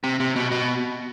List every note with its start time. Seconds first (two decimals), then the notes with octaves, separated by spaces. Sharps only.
0.04 C3
0.20 C3
0.36 B2
0.51 B2